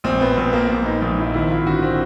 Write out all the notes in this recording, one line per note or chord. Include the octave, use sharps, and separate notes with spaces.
A#1 C4
B3
A#1 B3
A#3
A#1 A#3
D#4
A#1 D#4
E4
G#1 E4
F4
D3 F#4
C4